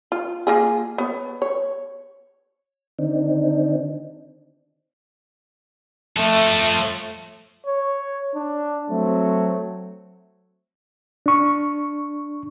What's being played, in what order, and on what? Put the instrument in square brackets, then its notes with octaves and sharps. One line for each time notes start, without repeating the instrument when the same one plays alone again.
[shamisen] F4
A#3 F4 G#4
B3 C#5
C#5
[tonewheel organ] D3 D#3 C4 D4 D#4
[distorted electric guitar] F3 A4 [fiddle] A3
[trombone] C#5
D4
[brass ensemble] F#3 C4 [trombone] A3
[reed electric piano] D4 C#6